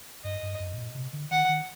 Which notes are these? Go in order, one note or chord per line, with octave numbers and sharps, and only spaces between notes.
G2 D#5
G2
F#2
A2
A#2
C3
D3
D#3 F#5
D#3